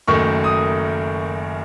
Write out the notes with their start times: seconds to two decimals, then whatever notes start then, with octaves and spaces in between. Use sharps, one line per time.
0.08 F#1 F#2 D#3 A3 C#6
0.44 D#6